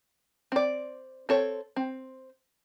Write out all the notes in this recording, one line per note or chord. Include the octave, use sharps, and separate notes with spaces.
C4 D5
C4 A4 C#5
C4